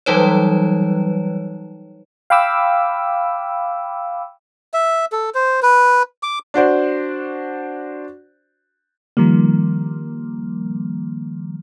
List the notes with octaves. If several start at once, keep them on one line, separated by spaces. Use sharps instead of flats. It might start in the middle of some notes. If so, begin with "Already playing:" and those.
E3 F#3 G3 D#4 B4 C#5
F5 G5 B5 D6 E6
E5
A4
C5
B4
D6
D4 F#4 C5 D5
D#3 F3 G3 A#3